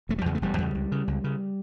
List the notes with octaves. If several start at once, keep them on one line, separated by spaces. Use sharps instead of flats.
E1 A3
G3
E2 C#3 F#3
A3
E1 G3
E2 C#3
C#2
C#3
C#2
C#3